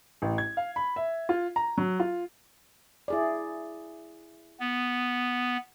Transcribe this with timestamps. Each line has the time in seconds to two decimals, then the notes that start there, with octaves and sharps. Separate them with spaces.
0.22 A1
0.38 G#6
0.57 F5
0.76 B5
0.96 E5
1.29 F4
1.56 A#5
1.78 F#3
2.00 F4
3.08 E4 G#4 D5
4.60 B3